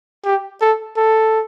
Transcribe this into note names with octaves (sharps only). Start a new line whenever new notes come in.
G4
A4
A4